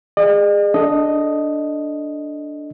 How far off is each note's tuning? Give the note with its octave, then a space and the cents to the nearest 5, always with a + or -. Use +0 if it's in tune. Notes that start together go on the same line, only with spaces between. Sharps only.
G#4 -20 D#5 -45
D4 +0 A4 +0 D#5 +0